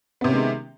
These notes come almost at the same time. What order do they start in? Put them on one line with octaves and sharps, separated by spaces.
B3 C3 C#4 D#3 G#3